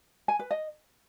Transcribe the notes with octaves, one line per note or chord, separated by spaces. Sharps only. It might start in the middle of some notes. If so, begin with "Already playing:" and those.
G#5
B4
D#5